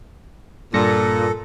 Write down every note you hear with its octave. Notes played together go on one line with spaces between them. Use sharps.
G2 A#2 A4 A#6 C#7